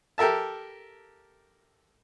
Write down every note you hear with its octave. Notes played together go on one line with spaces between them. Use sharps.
G4 A4 A#4 E5 A5